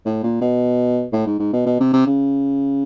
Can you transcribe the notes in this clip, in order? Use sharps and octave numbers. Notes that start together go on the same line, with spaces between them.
A2
A#2
B2
A2
G#2
G#2
B2
B2
C3
C3
C#3